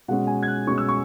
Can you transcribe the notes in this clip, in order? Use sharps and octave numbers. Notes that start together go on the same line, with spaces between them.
B2 G#3 C#4 F#5
G#5
G#6
F#6
B2 G#3 C#4 C#6
E6
C#6